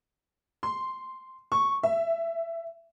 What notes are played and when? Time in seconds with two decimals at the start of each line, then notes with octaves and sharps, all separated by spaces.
0.63 C6
1.52 C#6
1.83 E5